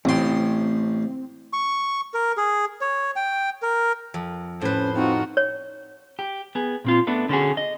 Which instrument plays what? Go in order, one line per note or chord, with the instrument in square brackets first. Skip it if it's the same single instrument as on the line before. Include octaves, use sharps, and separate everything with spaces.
[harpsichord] A1 C6 [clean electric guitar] A3 F5 G5 [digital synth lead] C4
[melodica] C#6
A#4
G#4
C#5
G5
A#4
[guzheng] F2
[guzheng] A2 B4 [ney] C#4 [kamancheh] C5
[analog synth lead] C4 [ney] D#4 [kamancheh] F4 F#4
[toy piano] C#5
[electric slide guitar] G4
B3 G#4
A#2 C4 F4
A3 B3 D4
D3 C#4 F#4 G#4
D#5